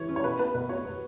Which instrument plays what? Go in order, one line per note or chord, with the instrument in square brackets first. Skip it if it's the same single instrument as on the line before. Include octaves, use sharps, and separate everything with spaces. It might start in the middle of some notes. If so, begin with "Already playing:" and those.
Already playing: [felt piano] E3 [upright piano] C#5
[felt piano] C#4
[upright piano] C#5
[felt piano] B2 [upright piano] B4
[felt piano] B3 [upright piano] B4
[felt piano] B2 [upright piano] B4
[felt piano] F#4 [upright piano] C#5
[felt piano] B3